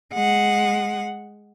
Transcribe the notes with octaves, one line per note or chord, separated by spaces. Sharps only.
G#3 F#5